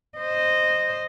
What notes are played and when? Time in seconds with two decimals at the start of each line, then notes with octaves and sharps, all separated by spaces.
0.18 C5 D#5